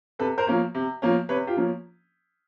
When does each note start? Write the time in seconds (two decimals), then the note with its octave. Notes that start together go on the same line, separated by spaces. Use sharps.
0.19 C3 A4 B4
0.38 A#4 C5
0.47 F3 A#3 C#4
0.75 C3
1.02 F3 A#3 C#4
1.29 C3 B4 C#5
1.47 F4 G4
1.57 F3 A#3 C#4